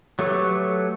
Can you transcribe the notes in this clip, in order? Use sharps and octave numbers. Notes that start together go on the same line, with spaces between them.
F#3 A3 G4 A4 B4 C#5